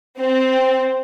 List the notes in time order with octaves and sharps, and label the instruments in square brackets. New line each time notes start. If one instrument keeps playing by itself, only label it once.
[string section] C4